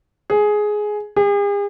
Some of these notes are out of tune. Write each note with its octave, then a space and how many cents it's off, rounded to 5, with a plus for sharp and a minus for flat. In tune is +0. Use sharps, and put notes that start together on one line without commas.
G#4 +10
G#4 -45